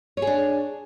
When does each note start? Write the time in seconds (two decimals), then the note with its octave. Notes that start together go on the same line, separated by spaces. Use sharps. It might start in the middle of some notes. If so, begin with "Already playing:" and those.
0.17 C#5
0.22 G#4
0.27 D4